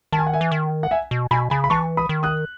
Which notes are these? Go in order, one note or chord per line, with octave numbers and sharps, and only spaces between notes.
D#3 A5
G#5
F#5
E5 G#5
E3
D#3
F#5
E5 G#5
B2
B2 G#5 B5
C#3 G#5 B5
B5
E3 A5 C#6
B5 D#6
D#3
D#6 F#6